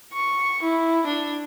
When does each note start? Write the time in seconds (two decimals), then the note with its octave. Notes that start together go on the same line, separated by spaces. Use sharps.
0.13 C#6
0.62 E4
1.06 D4